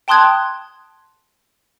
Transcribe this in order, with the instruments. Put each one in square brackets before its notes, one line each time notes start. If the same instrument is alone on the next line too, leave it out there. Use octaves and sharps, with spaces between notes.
[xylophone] G5 A5 C6 D#6 F#6 G#6